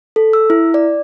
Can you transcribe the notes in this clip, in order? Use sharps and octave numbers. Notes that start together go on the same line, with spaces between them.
A4
E6
E4
D5